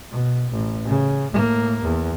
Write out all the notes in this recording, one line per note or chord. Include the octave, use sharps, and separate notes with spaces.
B2
A1
C#3
A2 A#3
E2